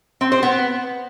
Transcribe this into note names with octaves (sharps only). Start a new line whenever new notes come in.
C4
C5
B3